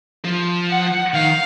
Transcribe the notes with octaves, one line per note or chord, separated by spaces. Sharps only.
F3
F#5
D#3 F5